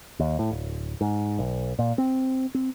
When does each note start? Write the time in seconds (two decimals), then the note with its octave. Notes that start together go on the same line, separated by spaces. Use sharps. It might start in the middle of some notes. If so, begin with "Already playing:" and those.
0.20 D#2
0.39 A2
0.51 D1
1.01 G#2
1.39 B1
1.79 A#2
1.98 C4
2.55 C4